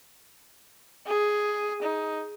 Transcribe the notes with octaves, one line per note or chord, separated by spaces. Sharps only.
G#4
D#4